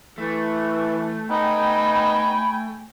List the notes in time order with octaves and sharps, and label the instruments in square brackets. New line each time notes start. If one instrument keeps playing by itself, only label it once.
[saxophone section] E3 [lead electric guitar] A3
[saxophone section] B3 D#4 [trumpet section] G5 G#5 [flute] B5